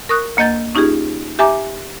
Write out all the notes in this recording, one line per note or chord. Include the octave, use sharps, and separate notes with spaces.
A#4 C#6 D#6 F#6
D2 A#3 D#5 G6 A6
C#4 D#4 F4 G4 G#4
G4 E5 G#5 A#5 D6